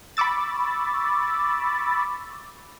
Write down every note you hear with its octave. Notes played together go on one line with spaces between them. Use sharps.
B5 C#6 D6 E6 A6